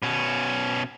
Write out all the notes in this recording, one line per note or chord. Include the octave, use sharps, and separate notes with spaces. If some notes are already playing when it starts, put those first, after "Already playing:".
B2 C#4